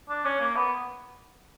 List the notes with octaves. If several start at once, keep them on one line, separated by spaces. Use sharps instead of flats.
D4
C#4
A#3
B3